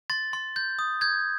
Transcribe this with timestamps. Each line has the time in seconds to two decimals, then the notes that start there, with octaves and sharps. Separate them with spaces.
0.10 C6 A6
0.33 C6
0.56 G6
0.79 D#6
1.01 G6 G#6